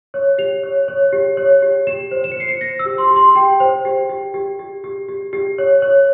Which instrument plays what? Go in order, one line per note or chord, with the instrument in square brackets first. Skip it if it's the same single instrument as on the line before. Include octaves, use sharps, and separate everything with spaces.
[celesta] C#5
G4 F7
C#5
C#5
G4
C#5
G4
G4 E7
C5
E7
C#7
C5 C7
C#7
C5 A#6
E6
G4
C6
G4
C6
G4 G5
C5
G4
G4
G4
G4
G4
G4
G4
C#5
C#5